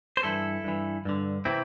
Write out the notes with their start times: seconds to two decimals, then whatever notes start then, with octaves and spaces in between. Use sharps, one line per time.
0.17 C5
0.23 G2 E3 E4 A4
0.64 G2 E3
1.05 G2 D3
1.45 C3 E3 C4 E4